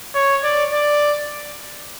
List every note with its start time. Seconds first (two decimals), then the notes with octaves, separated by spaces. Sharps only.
0.15 C#5
0.44 D5
0.73 D5